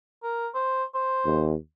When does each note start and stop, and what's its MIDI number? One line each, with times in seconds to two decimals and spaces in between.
0.23 0.47 70
0.54 0.84 72
0.94 1.49 72
1.25 1.55 39